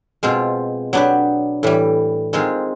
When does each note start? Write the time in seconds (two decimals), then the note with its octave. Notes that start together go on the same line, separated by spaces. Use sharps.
0.23 B2 G#3 C4 F4
0.93 F#3 B3 D4 G4 B4
1.63 A2 E3 G3
2.33 D#3 G#3 C4 F4 G#4